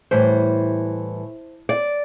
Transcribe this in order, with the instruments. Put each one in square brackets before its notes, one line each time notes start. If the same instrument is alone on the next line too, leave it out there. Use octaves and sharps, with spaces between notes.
[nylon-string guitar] A2 E3 G3 C5
D5